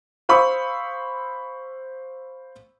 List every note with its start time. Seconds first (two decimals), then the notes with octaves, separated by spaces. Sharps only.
0.29 C5 F5 B5 C#6 D#6 E6